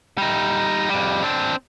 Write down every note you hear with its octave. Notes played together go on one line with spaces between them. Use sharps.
G3 D#4
F2 G3
C4 D4